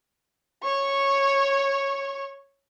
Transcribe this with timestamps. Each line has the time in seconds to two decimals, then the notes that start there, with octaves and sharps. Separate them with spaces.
0.64 C#5 C#6